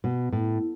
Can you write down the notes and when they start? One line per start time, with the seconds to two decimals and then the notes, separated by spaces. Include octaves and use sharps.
0.04 B2
0.33 A2